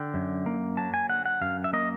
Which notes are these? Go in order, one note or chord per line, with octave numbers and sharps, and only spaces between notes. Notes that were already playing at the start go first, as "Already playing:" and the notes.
Already playing: D3 G5
F#2
A#3
F#3 A5
G#5
D3 F#5
F#5
F#2 F5
E5
A#3 D#5